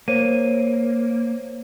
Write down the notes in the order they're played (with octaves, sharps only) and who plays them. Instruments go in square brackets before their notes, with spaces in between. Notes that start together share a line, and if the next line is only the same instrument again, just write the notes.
[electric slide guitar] A#3 [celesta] C5 C#5 D#7